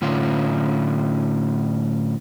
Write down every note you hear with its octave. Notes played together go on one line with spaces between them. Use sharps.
A2 D3 C#4 F4 F5